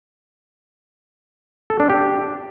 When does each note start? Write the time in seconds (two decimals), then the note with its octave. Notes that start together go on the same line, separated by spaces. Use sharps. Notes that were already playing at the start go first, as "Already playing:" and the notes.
1.70 A4
1.80 D4
1.90 G4